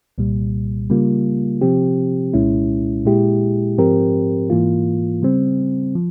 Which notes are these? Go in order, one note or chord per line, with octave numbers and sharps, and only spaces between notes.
C2 A#2 G3
C#3 G3 A#3 F4
C3 F3 C4 G4
C2 A#2 G#3 C#4 E4
A#2 G#3 E4 G4
G#2 F3 C4 G4 A#4
G#2 E3 A#3 F4
C#3 G3 C4
F3